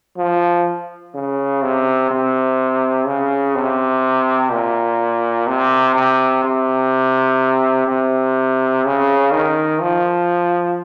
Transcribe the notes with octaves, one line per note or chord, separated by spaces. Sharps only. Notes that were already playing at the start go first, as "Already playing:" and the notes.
F3
C#3
C3
C3
C#3
C3
A#2
C3
C3
C3
C3
C#3
D#3
F3